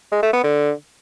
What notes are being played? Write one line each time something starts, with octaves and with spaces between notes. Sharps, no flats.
G#3
A3
B3
D3